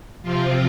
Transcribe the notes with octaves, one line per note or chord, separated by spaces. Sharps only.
C3 F3 C4 F4